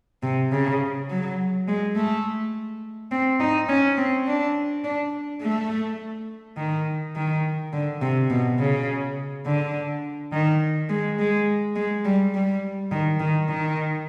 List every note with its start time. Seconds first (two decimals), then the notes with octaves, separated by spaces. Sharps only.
0.23 C3
0.52 C#3
1.10 F#3
1.68 G#3
1.96 A3
3.11 C4
3.40 D#4
3.69 C#4
3.97 C4
4.27 D4
4.84 D4
5.42 A3
6.57 D#3
7.16 D#3
7.73 D3
8.01 C3
8.30 B2
8.59 C#3
9.46 D3
10.33 D#3
10.89 G#3
11.19 G#3
11.76 G#3
12.05 G3
12.35 G3
12.92 D#3
13.20 D#3
13.49 D#3